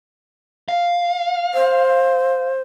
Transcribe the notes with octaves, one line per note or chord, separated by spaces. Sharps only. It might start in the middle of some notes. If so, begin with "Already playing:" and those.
F5
C5